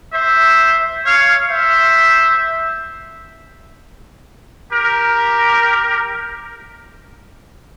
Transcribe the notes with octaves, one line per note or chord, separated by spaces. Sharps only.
C5 E5
C#5 F5
C5 E5
G4 A#4